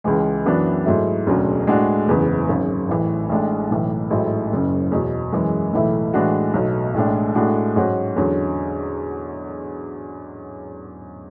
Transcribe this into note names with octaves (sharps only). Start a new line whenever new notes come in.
C#2 C#3 E3 G#3
F#2 E3 B3 D4 F#4
G#2 F#3 A3 E4
E1 D2 C#3 F#3
A2 G#3 D4 F#4
F#1 E2 C#3 E3 B3
G#1 F#2 C#3
A1 A2 E3
A1 A2 G#3 D4
B1 A2 E3
A1 G#2 F#3 A3 E4
F#1 F#2 C#3
E2 B2 F#3
F#2 E3 G#3
B1 A2 E3 A3 E4
A2 E3 G#3 D4 F#4
B1 B2 F#3 A3
A1 A2 G#3 D4
A2 G#3 D4 F#4
G#2 F#3 C#4 F#4
E2 D3 F#3 C#4